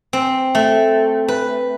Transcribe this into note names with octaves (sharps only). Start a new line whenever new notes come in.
C4
A3
B4